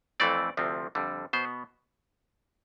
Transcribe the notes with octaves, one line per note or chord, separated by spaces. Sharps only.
F2 E3 A3 C4 D5
D2 C3 F3 C4
F2 D3 G3
B2 B3 C5